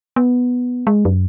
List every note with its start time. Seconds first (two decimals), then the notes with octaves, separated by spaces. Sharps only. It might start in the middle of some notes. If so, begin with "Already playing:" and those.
0.16 B3
0.87 G#3
1.05 F#2